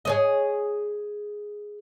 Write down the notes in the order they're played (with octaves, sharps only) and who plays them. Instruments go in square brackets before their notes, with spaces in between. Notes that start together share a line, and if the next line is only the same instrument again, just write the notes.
[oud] G#4 C#5 D#5